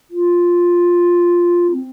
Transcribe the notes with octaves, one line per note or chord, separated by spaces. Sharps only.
F4
C4